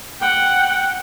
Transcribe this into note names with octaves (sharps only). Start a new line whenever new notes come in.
F#5 G5